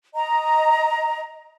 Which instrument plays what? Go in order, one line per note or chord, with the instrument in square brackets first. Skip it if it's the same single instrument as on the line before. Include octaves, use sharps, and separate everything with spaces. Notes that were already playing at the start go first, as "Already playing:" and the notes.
[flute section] D#5 A#5